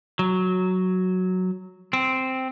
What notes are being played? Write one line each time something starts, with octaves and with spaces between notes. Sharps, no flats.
F#3
C4